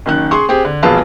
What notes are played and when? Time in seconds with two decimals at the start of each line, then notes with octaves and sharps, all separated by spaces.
0.06 F#1 D#3 F#6
0.31 G#4 C6 C#6
0.49 C4 G4 G#4
0.65 D3
0.83 E1 A#1 G#4 B4 F5 A5